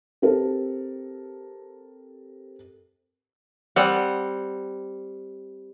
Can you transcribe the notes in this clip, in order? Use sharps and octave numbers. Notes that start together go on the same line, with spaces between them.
C4 G4 A4 A#4
G3 C4 F#5